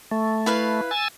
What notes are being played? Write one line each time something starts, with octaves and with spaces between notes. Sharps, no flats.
A3
E4 B4 F5
G#5 E6 A6